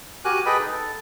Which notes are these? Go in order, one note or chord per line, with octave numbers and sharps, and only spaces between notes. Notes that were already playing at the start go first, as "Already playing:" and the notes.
F#4 G4 A#4 G#5 F#6
G#4 A4 B4 D#5 G5 B5
D#4
A4